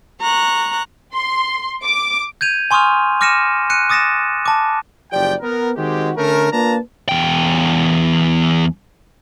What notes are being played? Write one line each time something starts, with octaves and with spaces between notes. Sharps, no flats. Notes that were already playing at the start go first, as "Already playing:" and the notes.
A#5 C#6 F#6
C6
D6
G6 G#6 D#7 F7
G#5 C6 C#6 D#6 F6 F7
D6 F6 A#6 C#7 D#7 E7
F#6 C#7 D#7
D6 D#6 A6 A#6 C#7 E7
A5 D6
F#1 F3 G4 D5 G5
B3 A#4
D#3 G#3 C4 F#4 G4
D3 A3 C#4 A#4
A#3 D4 F4 B4 A5 A#5
E2 G5